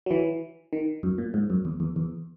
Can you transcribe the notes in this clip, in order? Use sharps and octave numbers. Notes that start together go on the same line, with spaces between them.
F#3
E3
D#3
F#2
A#2
G#2
F#2
E2
E2
E2